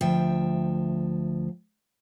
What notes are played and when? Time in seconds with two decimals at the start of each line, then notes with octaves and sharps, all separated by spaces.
0.01 D2 F3 E5 G5